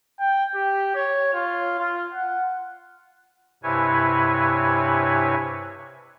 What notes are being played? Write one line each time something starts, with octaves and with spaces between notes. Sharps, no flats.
G5
G4
C#5
F4
F4
F#5
G2 C3 E4 B4 C#5 G#5